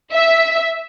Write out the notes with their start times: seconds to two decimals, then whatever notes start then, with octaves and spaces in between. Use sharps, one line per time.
0.13 E5